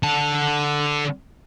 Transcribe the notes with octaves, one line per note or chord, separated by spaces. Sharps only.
D3 A5